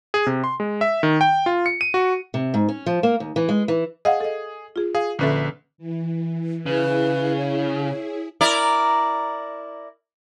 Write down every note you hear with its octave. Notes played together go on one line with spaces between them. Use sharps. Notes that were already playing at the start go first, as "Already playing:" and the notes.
G#4
C3
C6
G#3
E5
D#3
G5
F4
C#7
D#7
F#4
C3
G#2
C#4
F3
A#3
D#2
E3
G#3
E3
G#4 D#5 F5 F#5
A4 D#5
F4 G#4
G#4 F5
A#1 D3 C#4 A4 B4 E5
E3
C#3 E4 G#4 B4
C#5
E4 A#4 D5